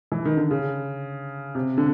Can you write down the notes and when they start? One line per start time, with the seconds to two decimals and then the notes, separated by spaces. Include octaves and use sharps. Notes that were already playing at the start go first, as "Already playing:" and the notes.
0.12 E3
0.25 D#3
0.37 D3
0.51 C#3
1.55 C3
1.78 D3